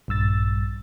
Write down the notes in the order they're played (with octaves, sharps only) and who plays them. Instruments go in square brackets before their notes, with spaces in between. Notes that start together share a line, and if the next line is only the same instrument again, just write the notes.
[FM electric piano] A#1 G2 E6 A6